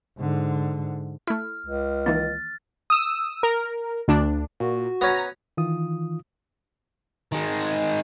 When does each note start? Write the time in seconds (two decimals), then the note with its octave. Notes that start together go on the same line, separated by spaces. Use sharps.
0.18 G#2 D3
1.27 A3 E4 F6
1.67 C#2
2.06 D#3 E3 A#3 A6
2.90 D#6 E6
3.43 A#4
4.08 D2 D4
4.60 A#2 F#4
5.01 B3 C#4 A#5
5.57 D#3 E3 F4 D#6
7.32 D#3 G#3